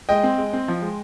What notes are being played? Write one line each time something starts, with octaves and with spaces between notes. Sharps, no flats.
G#3 D#5 G5
C4
G#3
C4
F3
G#3